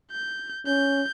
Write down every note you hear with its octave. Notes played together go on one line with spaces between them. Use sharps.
G6
C#4 G6